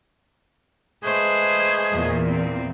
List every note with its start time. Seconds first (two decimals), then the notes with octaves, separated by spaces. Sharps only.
1.03 G#3 A3 G#4 B4 C5
1.91 E2 A#2
2.27 C4